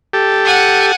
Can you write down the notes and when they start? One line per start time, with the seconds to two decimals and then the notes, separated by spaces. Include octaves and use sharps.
0.13 G4 A4
0.44 F#5 G#5